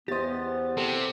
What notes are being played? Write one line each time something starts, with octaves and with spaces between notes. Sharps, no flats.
E2 B3 G4 C5 D#5 A6
C3 A4